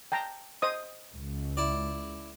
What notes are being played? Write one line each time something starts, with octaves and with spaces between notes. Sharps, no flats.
G5 A5 A#5
C5 D#5 D#6
C#2
E4 D5